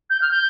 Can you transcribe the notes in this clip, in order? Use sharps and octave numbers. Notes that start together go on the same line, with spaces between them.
G6
F6
G6